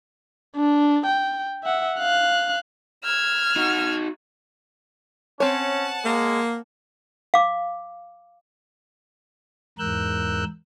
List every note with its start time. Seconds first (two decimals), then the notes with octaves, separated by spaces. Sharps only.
0.56 D4
1.06 G5
1.64 E5 F#5
1.99 F5 F#6
3.04 E6 F6 G#6
3.56 D#4 F#4
5.40 C4 C#4 C#5 F#5 A5
6.05 G#3 A#3
7.34 F5 D6
9.78 E2 G#2 A#4 E6 F#6 G6